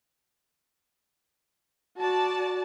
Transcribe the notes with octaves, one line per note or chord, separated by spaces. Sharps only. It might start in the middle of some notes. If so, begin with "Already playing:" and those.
F#4 D5 A5